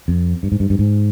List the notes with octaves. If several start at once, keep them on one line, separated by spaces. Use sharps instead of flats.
F2
G2
G#2
G2
G2
G#2